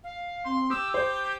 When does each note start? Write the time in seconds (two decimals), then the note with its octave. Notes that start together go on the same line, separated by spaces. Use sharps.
0.04 F5
0.45 C4 C6
0.70 G4 D#6 E6
0.94 C5 G6